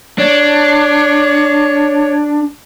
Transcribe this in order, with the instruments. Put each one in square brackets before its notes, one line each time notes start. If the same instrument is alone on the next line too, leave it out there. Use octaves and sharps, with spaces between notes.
[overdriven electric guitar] D4 [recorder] C#5